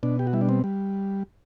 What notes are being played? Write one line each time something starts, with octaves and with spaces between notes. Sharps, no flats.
B2 D4
G4
F#4
G3 E4
D4
C4
G3